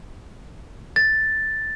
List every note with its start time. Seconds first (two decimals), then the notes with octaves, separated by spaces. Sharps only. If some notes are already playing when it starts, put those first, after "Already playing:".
0.96 A6